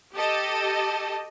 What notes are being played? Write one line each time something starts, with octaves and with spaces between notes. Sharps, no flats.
G4 A4 D#5